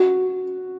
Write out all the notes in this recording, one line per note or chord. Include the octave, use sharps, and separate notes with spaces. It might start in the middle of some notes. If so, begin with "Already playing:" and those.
Already playing: F#4